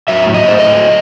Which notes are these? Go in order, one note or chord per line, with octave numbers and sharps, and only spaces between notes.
F#3 E5
A2
D#5
A2
C5
A3 D#5
F#3